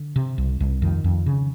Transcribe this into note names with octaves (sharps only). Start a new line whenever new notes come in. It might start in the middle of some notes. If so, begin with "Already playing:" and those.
Already playing: D3
C3
C2
C2
F2 D#3
F2
C#3